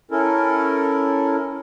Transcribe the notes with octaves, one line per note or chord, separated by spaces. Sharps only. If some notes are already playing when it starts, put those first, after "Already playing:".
C#4 E4 A4 A#4